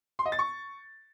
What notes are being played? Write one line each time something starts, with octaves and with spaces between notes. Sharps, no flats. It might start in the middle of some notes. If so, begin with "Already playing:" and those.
C6
D#5
A6
C#6